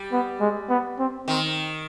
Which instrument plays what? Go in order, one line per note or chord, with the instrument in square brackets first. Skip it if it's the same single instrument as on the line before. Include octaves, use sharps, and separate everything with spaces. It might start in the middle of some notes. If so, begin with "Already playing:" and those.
Already playing: [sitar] G3
[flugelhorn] B3
G#3
B3
C4
[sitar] D#3 [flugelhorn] C4